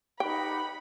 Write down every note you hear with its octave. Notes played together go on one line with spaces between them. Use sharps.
D#4 G4 B4 F#5 G5 B5